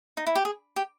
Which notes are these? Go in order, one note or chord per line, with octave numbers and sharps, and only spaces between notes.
D#4
E4
G4
G#4
G4